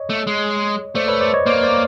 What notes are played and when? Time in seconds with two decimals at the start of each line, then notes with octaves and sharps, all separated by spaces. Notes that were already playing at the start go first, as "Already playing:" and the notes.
Already playing: C#5 D#5
0.10 A3
0.27 G#3
0.95 A3 C5 D5
1.08 B4 C#5
1.21 C5 D5
1.34 C#5 D#5
1.46 A#3 C5 D5
1.63 C5 D5